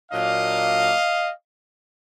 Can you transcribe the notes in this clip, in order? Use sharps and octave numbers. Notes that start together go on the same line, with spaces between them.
A#2 F#3 A#3 D4 D#5 F5